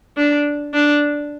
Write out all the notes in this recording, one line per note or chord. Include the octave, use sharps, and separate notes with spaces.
D4
D4